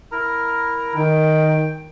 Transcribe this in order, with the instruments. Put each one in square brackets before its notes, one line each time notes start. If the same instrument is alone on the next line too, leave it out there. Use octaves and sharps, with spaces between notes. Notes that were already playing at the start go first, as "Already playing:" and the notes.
[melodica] E4 A#4 A#5
[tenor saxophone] D#3 [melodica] G5